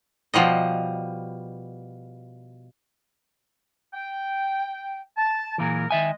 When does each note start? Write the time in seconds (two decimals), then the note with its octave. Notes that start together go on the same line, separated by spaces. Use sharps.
0.34 B2 F3 G3 D#5
3.94 G5
5.16 A5
5.58 A#2 E3 F#3 G#4 A#4
5.91 D#3 G#3 D#5 E5 G#5